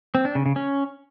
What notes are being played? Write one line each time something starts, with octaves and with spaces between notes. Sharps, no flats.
C4
D4
C#3
C#3
C#4